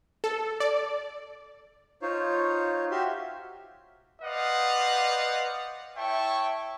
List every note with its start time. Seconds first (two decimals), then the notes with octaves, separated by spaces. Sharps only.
0.24 A4
0.60 D5
2.02 D#4 F4 C5 C#5
2.91 F#4 G4 E5 F5 C6
4.22 B4 C5 D5 D#5 F5 F#5
5.96 E4 C#5 E5 G5 A5 C#6